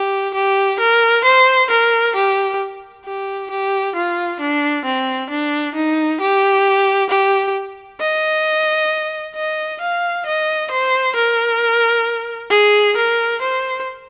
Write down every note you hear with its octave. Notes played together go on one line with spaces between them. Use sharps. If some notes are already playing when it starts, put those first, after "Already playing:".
Already playing: G4
G4
A#4
C5
A#4
G4
G4
G4
F4
D4
C4
D4
D#4
G4
G4
D#5
D#5
F5
D#5
C5
A#4
G#4
A#4
C5